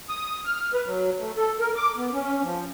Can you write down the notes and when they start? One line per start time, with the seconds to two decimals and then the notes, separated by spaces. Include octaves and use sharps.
0.09 D#6
0.45 F6
0.74 B4
0.86 F#3
1.19 A3
1.37 A4
1.60 A#4
1.76 D6
1.97 B3
2.12 C#4
2.43 F3